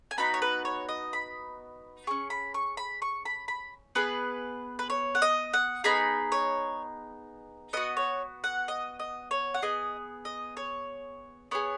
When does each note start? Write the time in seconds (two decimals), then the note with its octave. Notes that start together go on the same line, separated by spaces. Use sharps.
0.11 G#5
0.18 B3 D#4 F#4 B5
0.34 C#5
0.42 B4
0.65 C#5
0.89 D#5
1.13 B5
2.07 C#4 G#4 C#6
2.30 B5
2.54 C#6
2.77 B5
3.02 C#6
3.26 B5
3.48 B5
3.95 B3 G#4 B4
4.79 B4
4.90 C#5
5.15 F#5
5.22 D#5
5.54 F#5
5.84 B3 D#4 G#4 B5
6.32 C#5
7.73 B3 F#4 D#5
7.97 C#5
8.44 F#5
8.68 D#5
8.99 D#5
9.31 C#5
9.54 F#5
9.62 B3 G#4 D#5
10.25 D#5
10.57 C#5
11.51 B3 G#4 C#5